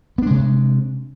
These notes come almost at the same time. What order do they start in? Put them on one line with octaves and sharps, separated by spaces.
B3 D4 G#3 C3